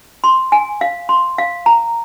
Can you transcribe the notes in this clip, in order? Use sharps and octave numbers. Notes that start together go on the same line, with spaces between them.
C6
G#5
F5
C6
F5
A#5